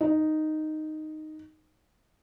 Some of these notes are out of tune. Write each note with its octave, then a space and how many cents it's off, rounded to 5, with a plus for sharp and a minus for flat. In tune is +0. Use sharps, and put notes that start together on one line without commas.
D#4 -5